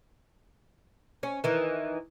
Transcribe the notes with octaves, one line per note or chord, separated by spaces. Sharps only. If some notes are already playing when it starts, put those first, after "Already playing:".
C#4
D#3 E3